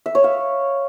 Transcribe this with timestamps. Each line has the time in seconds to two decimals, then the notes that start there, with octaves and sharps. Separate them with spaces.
0.06 E5
0.15 C#5
0.24 F5